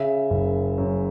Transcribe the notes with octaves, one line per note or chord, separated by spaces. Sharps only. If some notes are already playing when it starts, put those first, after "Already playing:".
Already playing: C#3 E5
F#1
F#2